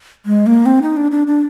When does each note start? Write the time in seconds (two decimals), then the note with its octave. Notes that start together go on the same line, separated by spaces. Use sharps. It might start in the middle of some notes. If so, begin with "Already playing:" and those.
0.26 G#3
0.46 A#3
0.66 C4
0.82 D#4
0.97 D4
1.11 D4
1.27 D4